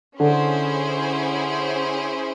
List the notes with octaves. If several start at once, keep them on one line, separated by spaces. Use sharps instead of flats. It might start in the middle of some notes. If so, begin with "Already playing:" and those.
D3 C#4 E4 G#4 C5